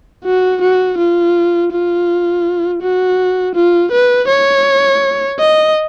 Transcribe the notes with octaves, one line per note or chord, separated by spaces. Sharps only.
F#4
F#4
F4
F4
F#4
F4
B4
C#5
D#5